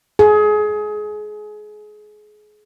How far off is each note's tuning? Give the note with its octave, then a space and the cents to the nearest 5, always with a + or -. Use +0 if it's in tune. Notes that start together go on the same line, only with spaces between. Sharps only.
G#4 +25